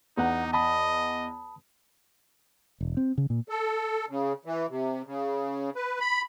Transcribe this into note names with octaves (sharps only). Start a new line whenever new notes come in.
E2 B3 D#4 F#5
D#5 A5 B5 D#6
E1
C4
C#3
A#2
A4
C#3
E3
C3
C#3
B4
B5